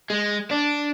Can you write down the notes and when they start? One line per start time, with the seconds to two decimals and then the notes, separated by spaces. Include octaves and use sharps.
0.10 G#3
0.51 D4